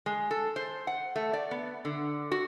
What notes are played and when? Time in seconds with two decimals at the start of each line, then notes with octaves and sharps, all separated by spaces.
0.06 G#3
0.31 A4
0.56 C5
0.87 F#5
1.16 A3
1.33 D5
1.51 B3
1.85 D3
2.32 F#4